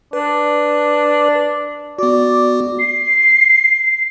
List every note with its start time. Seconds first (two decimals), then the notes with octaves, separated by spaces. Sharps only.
0.13 D4 B4
1.99 B3 F#4 D5
2.79 C7